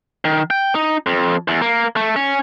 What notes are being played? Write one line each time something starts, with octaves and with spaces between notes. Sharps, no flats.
D#3
G5
D#4
F2
E2
A#3
A3
C#4